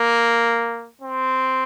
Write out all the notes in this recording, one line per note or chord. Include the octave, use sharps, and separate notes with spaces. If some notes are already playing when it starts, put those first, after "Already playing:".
Already playing: A#3
C4